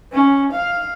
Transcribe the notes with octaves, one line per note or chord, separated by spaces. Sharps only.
C#4
F5